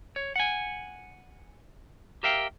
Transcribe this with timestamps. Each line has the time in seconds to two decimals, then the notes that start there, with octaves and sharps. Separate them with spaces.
0.16 C#5
0.36 F#5 G#5
2.23 G4 A#4 E5 F5 G5